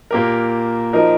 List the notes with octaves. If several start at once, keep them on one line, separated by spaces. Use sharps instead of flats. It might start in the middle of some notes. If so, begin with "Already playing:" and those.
A#2 A#3 G4 A#4
F3 D#4 A#4